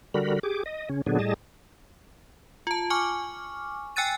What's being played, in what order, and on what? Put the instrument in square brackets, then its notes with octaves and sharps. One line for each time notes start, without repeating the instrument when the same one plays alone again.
[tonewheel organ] D3 G3 F#4 A#4 B5
G4 G#4 D6
D#5
C#3 C#4
A#2 D3 F#3 B3 D4 G#4
A2 G3 G#4 D#5 A5
[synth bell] F4 A5
G#5 C#6 D6 F6
G5 G#5 E6 F#6 A6 D#7